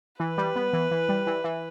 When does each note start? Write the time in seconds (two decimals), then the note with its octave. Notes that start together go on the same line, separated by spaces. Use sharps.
0.20 E3 B4
0.38 G3
0.56 B3
0.73 E3
0.91 E3
1.09 G3
1.27 E3
1.44 E3